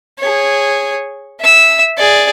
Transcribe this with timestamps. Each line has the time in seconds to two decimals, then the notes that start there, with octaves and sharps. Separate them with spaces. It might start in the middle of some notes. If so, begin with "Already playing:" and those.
0.19 G#4 C#5
1.40 E5 E6
1.98 G#4 D5